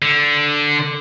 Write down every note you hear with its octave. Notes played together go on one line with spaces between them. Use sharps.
D3